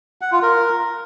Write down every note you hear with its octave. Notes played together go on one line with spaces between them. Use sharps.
F#5
F4
A#4